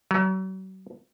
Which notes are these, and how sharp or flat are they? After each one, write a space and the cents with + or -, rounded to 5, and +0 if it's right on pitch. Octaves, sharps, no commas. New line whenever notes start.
F#3 +40